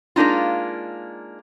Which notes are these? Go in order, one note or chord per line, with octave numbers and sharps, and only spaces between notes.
G#3 A#3 D4 D#4 F4